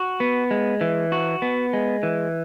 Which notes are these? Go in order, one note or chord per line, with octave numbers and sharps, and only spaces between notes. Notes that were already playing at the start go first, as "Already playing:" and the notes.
Already playing: F#4
B3
G#3
E3
F#4
B3
G#3
E3